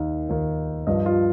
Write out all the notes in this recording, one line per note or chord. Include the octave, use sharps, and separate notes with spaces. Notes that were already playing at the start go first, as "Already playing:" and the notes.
Already playing: D#2 D#3
D#2 D#3
G2 F3 D#5
F4